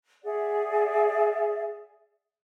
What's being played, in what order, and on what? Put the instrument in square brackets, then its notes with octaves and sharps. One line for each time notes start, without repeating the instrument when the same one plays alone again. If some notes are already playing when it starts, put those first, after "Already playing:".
[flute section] G#4 D5 E5 F#5